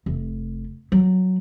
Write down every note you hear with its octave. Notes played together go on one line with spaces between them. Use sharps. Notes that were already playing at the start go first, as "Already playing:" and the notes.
F1
F#3